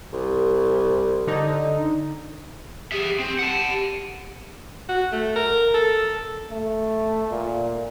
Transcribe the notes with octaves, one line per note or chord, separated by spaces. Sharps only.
C2
D3 D#4
G4 G#4 E5
C4
F#5 A5
F#4
A3
A#4
A4
A3
A#2